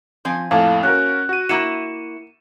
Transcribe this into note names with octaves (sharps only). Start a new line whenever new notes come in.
F3 C4 G#5
F2 A2 A#3 A4 F5 A5
C#4 F#4 A#4 F#6
F#4 D#7
A#3 E4 F#4 C#7 E7